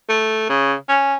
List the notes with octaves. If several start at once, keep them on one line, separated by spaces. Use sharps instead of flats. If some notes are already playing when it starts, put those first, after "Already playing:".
A3
C#3
C#4